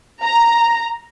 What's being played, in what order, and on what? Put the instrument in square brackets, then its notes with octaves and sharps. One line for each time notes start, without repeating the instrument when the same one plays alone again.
[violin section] A#5